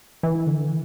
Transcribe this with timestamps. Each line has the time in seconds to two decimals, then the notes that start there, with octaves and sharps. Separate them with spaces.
0.23 E3
0.47 D3
0.69 E3